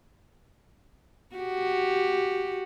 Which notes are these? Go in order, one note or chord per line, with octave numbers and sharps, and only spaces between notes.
F#4 G4